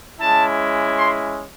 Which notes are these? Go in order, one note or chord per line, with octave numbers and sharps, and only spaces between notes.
G#3 C#4 E4 A5
C6